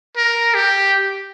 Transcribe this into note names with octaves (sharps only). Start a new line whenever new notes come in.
A#4
G4